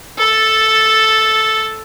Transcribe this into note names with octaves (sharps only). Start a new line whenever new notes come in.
A4 A5